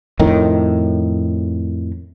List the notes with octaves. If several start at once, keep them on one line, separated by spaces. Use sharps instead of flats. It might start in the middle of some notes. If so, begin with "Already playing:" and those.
F2 A2 D#3